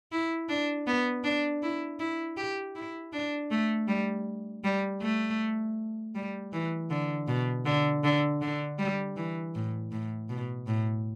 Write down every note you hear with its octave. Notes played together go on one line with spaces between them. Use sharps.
E4
D4
B3
D4
E4
E4
G4
E4
D4
A3
G3
G3
A3
G3
E3
D3
B2
D3
D3
D3
G3
E3
A2
A2
B2
A2